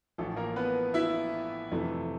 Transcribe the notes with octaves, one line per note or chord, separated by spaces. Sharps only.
A1 A2 F3 A3 A4
A#3 A#4
B3 B4
E4 E5
F2 C3 E3 A3